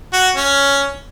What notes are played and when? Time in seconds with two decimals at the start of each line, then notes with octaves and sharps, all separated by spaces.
0.13 F#4
0.36 C#4